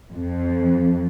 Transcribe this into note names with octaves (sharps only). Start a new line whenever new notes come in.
F2